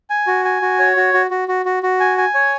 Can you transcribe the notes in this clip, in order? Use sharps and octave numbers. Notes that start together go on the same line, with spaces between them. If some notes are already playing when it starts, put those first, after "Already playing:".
G#5
F#4
G#5
F#4
C#5
F#4
F#4
F#4
F#4
F#4
F#4
G#5
G#5
C#5